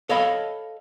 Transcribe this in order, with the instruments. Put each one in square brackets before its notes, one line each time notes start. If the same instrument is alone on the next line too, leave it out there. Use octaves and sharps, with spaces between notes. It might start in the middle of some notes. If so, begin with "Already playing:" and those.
[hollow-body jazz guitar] A4 C#5 D#5 F5 A5 B5